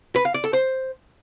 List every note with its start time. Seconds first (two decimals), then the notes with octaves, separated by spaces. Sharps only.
0.16 B4
0.25 F5
0.34 D5
0.44 A4
0.53 C5